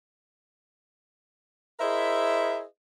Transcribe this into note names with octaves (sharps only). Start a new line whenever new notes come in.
E4 G#4 A#4 C5 D#5 E5